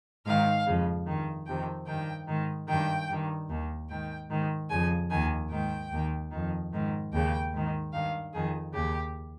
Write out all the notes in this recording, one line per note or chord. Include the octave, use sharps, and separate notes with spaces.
G#2 D#3 F5
F2 C#3
G2 D#3
F2 C3 D#3 G5
G2 D#3 G5
G#2 D#3
G2 D#3 G5
G2 D#3
D#2 D#3
G#2 D#3 G5
G#2 D#3
F2 C#3 G#5
D#2 D#3 G#5
G#2 D#3 G5
D#2 D#3
F2 D#3
G#2 D#3
D#2 C#3 G5
G#2 D#3
G2 D#3 F5
F2 D#3 G#4
D#2 C#3 G4